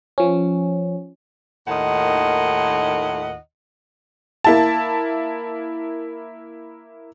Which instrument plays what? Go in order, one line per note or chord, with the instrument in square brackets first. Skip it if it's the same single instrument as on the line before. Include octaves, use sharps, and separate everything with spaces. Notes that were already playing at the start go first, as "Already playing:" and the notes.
[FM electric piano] F3 C#4
[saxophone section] D#2 A2 D#3 F4 D#5 F#5
[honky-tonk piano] A#3 E4 A5